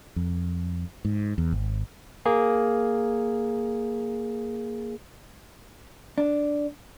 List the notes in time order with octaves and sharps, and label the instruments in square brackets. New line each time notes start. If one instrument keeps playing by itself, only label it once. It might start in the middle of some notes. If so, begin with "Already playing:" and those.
[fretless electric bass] F2
G#2
E2
G#1
[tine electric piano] A#3 G#4
[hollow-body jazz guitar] D4